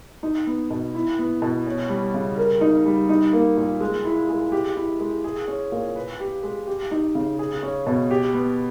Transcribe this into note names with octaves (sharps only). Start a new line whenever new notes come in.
D#4
B3
B2
E4
B3
B2
C#4
G3
C#3
A#4
D#4
G3
D#4
A#3
A#2
G#3
E4
G#3
G4
E4
G#3
G#4
C#4
A#2
B4
G4
G#3
G4
D#4
C#3
G#4
C#4
B2
G4
B3